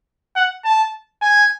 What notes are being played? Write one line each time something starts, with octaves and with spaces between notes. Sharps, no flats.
F#5
A5
G#5